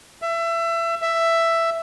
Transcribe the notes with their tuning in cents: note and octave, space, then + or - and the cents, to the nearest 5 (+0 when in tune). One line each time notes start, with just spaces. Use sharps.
E5 +25
E5 +10